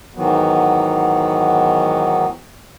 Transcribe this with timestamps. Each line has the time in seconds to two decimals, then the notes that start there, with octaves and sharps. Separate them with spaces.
0.15 G#2 D#3 E3 F#3 B3